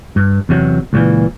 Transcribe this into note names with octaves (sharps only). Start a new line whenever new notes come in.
G2
E2 C3 F#3
C#2 A#2 E3